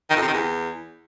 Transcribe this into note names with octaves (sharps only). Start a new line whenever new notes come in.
D#3
F2
C3
D#3
E2